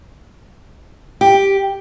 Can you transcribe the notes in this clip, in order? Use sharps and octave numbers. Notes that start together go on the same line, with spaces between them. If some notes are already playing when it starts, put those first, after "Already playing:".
G4